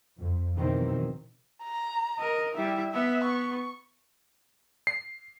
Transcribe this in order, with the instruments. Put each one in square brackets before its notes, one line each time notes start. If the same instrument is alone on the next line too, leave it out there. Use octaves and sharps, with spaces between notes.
[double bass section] F2
B2 D#3 E3 F#3 C4
[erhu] A#5
[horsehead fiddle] A#4 D#5
[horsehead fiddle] G3 E4 [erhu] E5
[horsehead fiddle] B3 [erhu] E5
[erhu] C#6
[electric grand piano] C7